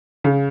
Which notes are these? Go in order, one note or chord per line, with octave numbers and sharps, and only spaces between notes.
C#3